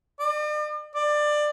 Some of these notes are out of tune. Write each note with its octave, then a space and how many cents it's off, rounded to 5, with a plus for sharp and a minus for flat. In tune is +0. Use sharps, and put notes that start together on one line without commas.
D5 +45
D5 +20